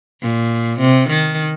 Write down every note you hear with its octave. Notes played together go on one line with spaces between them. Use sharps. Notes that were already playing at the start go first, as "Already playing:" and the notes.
A#2
C3
D#3